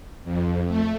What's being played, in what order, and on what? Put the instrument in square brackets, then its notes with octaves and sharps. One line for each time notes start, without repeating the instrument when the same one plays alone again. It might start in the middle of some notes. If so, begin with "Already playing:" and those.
[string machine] F2
A3